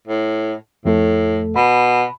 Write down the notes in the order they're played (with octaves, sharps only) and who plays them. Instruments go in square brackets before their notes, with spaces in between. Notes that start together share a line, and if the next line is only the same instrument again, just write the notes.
[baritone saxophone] A2
[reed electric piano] F2 A3 A4 [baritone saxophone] A2
[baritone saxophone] B2 [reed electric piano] B5